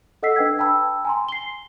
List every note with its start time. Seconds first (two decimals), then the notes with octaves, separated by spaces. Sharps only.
0.23 A4 D#5 F#5 E6 B6 C7
0.36 D4 B4 G5 E6 G#6
0.59 G5 A5 B5 E6
1.05 G#5 A#5 C6
1.28 C7 G7